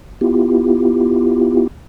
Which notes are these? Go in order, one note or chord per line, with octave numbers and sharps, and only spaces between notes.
B3 E4 F4 G4